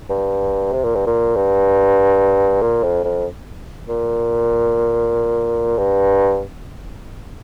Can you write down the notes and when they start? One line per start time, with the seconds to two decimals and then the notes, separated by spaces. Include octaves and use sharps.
0.09 G2
0.73 C3
0.84 A#2
0.96 G2
1.07 A#2
1.36 G2
2.62 A#2
2.83 F2
3.04 F2
3.88 A#2
5.78 G2